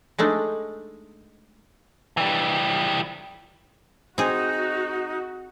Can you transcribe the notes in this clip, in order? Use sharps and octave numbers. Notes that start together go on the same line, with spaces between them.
G#3 A3 D4 D#4
E3 G3
C4 D#4 F#4 G#4